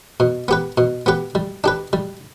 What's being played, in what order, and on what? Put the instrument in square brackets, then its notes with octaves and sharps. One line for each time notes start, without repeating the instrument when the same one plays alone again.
[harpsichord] B2
B3 G4 B4
B2
B3 G4 B4
G3
D4 G4 B4
G3